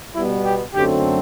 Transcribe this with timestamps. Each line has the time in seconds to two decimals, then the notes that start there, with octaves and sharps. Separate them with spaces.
0.14 B2 G3 B3 E4
0.45 G4
0.74 F#2 D3 F#3 A3 C4 G4